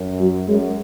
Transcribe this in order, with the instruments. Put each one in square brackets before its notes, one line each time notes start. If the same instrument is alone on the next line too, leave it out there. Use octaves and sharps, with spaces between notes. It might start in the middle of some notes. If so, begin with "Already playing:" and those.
Already playing: [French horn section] F#2
[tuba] F#3
[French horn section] F#2 [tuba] G#3